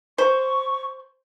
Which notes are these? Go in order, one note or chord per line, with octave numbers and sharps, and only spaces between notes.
C5 C#6